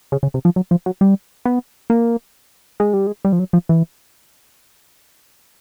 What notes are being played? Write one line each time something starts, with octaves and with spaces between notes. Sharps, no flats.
C#3
C#3
C3
F3
F#3
F3
F#3
G3
B3
A#3
G#3
G3
G#3
G3
F3
F#3
F3
E3